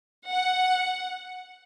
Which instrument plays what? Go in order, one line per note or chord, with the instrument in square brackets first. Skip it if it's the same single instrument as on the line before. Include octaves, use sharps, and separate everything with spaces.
[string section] F#5